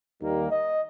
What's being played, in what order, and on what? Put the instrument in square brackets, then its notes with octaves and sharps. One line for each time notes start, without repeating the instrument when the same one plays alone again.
[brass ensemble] D#2 D#3 G3 A#3
D#5